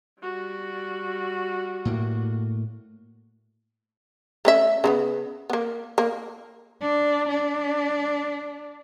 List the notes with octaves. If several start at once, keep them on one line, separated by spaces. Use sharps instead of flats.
G3 F#4
A2 A#3
A3 C#4 E5
C#3 F3 B3
A#3 B3
A#3
D4
D4